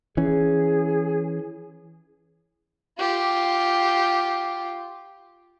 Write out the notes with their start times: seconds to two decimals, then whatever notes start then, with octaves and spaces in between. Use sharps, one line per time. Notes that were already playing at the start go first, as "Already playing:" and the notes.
0.17 E3 C#4 G#4
2.98 F4 G4